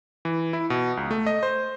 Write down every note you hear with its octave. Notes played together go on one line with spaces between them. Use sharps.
E3
E4
B2
C#2
A3
D#5
C5